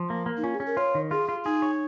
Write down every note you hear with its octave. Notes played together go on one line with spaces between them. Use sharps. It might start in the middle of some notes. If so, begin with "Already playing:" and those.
Already playing: F3
A#3
A#3
D#4
C#4 F4
G#4
C#4
A#4
F4 C#5
D#3
F4 G#4
F4
D#4 G#4
C#5